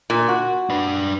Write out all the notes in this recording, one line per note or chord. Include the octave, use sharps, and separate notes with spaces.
A#2
F#4
D4 B4